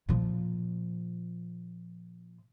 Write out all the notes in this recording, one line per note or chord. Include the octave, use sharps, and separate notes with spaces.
A#2 F3